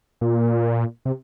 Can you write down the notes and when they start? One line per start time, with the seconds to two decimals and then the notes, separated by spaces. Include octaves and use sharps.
0.21 A#2
1.05 C3